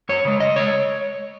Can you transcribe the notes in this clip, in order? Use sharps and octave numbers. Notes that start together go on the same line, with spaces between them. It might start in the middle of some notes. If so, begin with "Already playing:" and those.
F#2 C#5
C#3 G#3
F#2 D#5
C#3 G#3 C#5